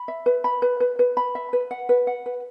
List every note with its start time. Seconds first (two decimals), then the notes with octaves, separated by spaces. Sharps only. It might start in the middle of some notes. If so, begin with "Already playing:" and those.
Already playing: B5
0.08 E5
0.26 B4
0.44 B5
0.62 B4
0.80 B4
0.99 B4
1.17 B5
1.35 E5
1.53 B4
1.71 F#5
1.89 B4
2.07 F#5
2.26 B4